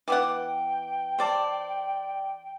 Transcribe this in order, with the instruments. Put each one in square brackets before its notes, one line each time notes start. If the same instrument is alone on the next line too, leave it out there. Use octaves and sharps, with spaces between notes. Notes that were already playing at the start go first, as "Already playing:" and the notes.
[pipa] E3 B3 F#5 [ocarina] G5 [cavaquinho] D6
[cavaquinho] C5 D5 A5